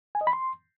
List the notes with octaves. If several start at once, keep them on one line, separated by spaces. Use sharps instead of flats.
G#5
D#5
B5
C6